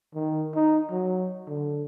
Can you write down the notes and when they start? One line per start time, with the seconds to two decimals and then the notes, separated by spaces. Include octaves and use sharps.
0.15 D#3
0.55 D#4
0.91 F#3
1.48 D3